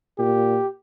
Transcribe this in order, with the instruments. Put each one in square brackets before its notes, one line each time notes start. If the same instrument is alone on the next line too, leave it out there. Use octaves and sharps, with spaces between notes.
[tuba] A#2 [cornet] G4